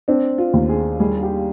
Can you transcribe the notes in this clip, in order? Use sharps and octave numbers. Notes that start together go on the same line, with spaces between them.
C4 D4
F4
D#2
G#4
G3 G#4
G4